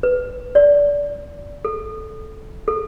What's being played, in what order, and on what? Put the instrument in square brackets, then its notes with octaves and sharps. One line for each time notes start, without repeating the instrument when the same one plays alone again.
[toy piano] B4
D5
A4
A4